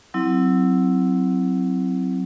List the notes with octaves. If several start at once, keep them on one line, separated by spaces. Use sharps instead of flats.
F#3 C4 E4